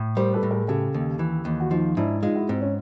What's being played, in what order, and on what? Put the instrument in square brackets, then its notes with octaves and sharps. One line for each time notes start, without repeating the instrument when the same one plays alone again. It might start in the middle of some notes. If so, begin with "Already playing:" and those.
Already playing: [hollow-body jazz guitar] A2
[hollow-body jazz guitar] G3 [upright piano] A#4 C5
[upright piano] A4 B4
[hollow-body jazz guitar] A2
[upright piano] G#4 A#4
[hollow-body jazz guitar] C#3 [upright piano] G4 A4
[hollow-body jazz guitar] D#2
E3
D#2
[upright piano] F#4
[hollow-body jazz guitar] F3 [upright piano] D#4 F4
[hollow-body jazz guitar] G#2 [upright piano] D4 E4
[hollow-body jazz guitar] G#3 [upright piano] D#4 F4
[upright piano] E4 F#4
[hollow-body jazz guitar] G#2 [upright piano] C4
[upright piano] C#4